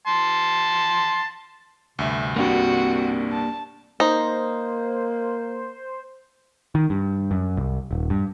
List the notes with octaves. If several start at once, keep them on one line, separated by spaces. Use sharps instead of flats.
A5 C6
D2 G2 C3 E5
C2 G2 A#3 C4 D4 F#4 G4
A5
A#3 D#4 C5
D#3
G2
F#2
C2
D#1
G2